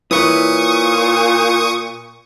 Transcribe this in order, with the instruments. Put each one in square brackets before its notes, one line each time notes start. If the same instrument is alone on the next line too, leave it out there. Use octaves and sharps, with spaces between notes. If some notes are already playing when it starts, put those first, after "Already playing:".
[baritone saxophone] A#2 [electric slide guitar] E4 B4 C#5 [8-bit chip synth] C#6 D#6